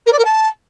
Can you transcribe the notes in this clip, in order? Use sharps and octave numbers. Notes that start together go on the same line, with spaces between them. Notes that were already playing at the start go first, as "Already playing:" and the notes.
A#4
D5
A#4
A5